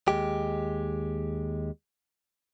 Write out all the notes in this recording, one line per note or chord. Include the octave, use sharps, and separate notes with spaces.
D#2 G#3 G4